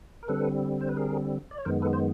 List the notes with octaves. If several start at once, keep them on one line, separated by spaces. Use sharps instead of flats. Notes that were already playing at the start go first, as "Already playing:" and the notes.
A#4
D3 G3 C4 A4 B4
C5
B4
G#4 A#4
D5
C#5
F#2 D#3 G#3 B3 A#4 C5
A4 B4
C5